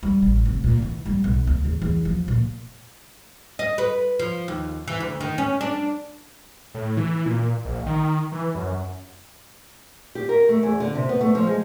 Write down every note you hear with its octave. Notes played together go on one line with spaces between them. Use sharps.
G3
A1
F1
A#2
E3
G3
B1
D2
E2
E2
F3
A#2
D#5
B4
F3
D#2
E3
D2
D#3
C#4
D4
A2
E3
A#2
A#1
D#3
E3
F#2
G4
A#4
A3
E2
D3
C3
B3
A3
F3
G#3